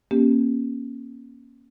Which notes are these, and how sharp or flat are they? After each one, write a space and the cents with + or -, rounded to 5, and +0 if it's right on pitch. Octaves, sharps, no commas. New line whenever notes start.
A#3 +30 C#4 -10 G4 +0